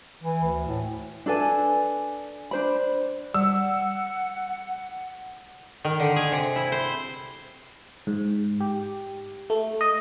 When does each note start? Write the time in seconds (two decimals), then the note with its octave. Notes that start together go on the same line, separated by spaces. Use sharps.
0.24 E3
0.44 D2
0.67 A2
1.26 D4 A4 B4 G#5
2.51 D4 C5 B5
3.34 G3 F#5 E6
5.85 D#3
6.00 D3
6.16 G#4
6.32 C3
6.56 E4
6.72 C5
8.07 G#2
8.60 G4
9.50 A3
9.81 D#5